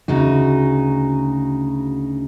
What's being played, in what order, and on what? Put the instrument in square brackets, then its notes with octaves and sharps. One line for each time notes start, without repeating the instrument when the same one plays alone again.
[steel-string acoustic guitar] D2 C#3 D#4 F#4